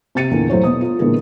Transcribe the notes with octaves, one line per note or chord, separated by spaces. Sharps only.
C3 G4 A6 C#7 D#7
E2 A#2 D3
E3 F#3 A3 C5 C#5
B2 B3 D#6
F4
A#2 D3 E3 G#3 A#3 B3